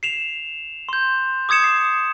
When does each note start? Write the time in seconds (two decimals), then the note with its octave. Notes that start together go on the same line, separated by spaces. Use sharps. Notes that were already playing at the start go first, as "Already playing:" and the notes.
0.03 C7 E7 F7
0.89 C6 G6
1.49 D6 D#6 G#6 C#7 E7
1.64 C7